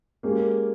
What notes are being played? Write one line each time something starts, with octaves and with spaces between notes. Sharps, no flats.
G#3 A#3 C#4 G4 A#4